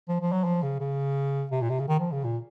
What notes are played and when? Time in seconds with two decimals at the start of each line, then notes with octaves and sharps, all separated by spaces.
0.09 F3
0.21 F3
0.32 F#3
0.45 F3
0.63 C#3
0.80 C#3
1.52 C3
1.62 A#2
1.70 C3
1.80 C#3
1.88 D#3
2.00 F3
2.12 C#3
2.24 A#2